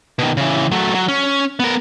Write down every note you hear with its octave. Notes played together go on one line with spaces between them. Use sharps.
B2 D#3
C#3 E3
F#3 A3
F#3
C#4
B3 A#4